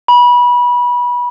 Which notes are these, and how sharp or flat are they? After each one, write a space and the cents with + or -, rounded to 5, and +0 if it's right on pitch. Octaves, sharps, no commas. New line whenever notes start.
B5 -25